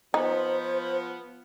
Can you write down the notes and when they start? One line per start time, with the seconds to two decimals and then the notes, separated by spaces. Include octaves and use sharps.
0.14 F3 B3 D#4 C5